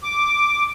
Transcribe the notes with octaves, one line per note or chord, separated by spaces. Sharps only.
D6